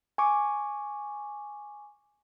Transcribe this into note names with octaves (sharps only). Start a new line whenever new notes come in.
G#5 C#6 D6